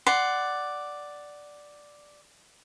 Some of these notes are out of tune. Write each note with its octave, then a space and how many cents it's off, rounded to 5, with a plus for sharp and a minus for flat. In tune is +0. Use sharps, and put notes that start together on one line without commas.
D5 +0 F#5 +10 C6 +0